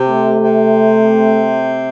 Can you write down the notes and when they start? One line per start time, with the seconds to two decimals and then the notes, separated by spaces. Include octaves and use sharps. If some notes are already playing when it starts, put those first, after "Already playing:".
Already playing: C3
0.08 A3
0.39 C3